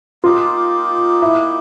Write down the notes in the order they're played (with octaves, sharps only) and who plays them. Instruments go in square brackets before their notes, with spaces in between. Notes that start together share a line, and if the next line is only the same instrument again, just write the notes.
[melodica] A#3 D#4 G4 [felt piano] F4
[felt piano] E4